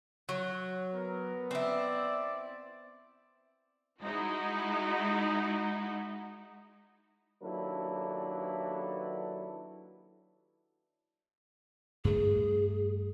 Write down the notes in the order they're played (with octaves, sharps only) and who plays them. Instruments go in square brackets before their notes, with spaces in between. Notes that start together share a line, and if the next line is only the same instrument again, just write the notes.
[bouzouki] F#3
[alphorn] B3 [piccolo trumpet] A#4
[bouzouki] C4 E4 [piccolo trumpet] D5
[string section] G#3 D#4 E4 F#4
[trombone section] D#2 F#3 D4 E4 A4 B4
[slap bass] G2 A3 [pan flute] G#4